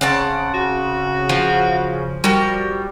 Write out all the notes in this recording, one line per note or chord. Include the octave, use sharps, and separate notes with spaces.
C#3 C4 D5 F#5 A5
F#4
F3
G3 F#4 G4 A#4